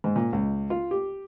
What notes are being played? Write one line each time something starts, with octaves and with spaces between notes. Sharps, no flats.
G#2
A#2
C#2
F4
G4